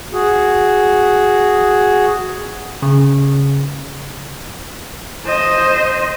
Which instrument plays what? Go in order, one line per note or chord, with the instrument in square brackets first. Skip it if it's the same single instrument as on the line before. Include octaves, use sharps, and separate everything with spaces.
[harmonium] F#4 G#4
[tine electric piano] C#3
[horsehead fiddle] C5 D#5